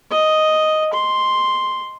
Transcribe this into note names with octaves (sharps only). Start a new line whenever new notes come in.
D#5
C6